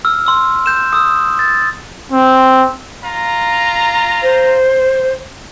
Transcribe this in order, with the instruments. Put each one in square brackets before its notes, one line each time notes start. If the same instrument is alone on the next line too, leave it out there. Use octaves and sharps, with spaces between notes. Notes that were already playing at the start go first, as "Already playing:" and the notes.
[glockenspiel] E6 F6
C6 E6
G6 E7
D#6 E6
A6
[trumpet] C4
[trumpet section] F4 A#5
[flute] C5